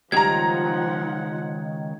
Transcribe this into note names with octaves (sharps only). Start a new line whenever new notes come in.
C#2 D#3 F3 G3 F#5 A#5 G#6